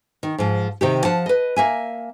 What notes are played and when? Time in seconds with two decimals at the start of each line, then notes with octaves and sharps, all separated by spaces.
0.23 D#3
0.38 G#2 F3
0.81 C3 D#3 G4
1.05 F3 F#5 A5
1.26 B4 D#5
1.56 A#3 E5 G#5